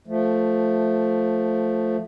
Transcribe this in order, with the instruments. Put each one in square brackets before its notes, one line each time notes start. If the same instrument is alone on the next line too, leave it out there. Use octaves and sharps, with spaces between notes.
[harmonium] F3 A3